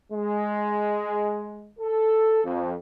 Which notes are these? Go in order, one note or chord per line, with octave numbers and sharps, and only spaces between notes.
G#3
A4
F2